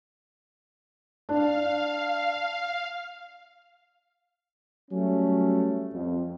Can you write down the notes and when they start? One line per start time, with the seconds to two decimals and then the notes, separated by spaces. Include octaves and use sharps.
1.29 D4 F5
4.91 F#3 G3 A3 C#4
5.92 F2